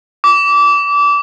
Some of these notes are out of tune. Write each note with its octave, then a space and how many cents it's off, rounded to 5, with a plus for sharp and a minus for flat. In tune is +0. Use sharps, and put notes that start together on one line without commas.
D6 -25